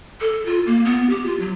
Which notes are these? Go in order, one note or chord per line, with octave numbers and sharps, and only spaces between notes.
A4
F4
A#3
B3
G4
F4
F#3